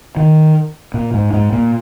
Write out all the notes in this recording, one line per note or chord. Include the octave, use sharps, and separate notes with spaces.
D#3
A#2
G#2
G#2
A#2